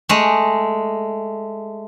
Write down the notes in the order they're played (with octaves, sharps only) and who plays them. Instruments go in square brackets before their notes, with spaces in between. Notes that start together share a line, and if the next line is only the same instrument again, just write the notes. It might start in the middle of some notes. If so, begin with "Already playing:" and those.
[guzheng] G#3 A3